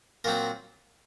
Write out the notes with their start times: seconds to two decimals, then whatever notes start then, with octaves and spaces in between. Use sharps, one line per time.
0.24 A#2 F#3 C4 A#4